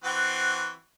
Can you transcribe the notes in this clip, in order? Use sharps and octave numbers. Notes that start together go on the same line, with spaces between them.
E3 C4 F#4